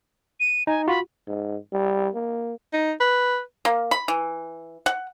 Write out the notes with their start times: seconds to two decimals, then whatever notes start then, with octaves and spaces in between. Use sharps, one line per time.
0.40 D#7
0.67 D#4 G#5
0.88 F4 F#4 B5
1.28 G#2
1.73 G3
2.14 A#3
2.73 D#4
3.00 B4
3.65 A#3
3.91 B5
4.08 E3
4.86 F#5